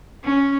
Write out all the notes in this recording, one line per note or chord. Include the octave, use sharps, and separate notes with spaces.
C#4